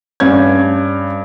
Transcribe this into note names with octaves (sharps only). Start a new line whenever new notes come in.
G2 C#4 G#6